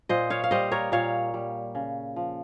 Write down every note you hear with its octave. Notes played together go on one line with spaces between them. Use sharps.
A#2 C5 D#5
C#5 F5
F5
G3 C5 D#5
A#4 C#5
A#2 C#5 F5
G3
C#3
F3